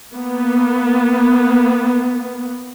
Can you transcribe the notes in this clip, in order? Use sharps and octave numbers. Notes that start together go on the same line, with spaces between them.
A#3 B3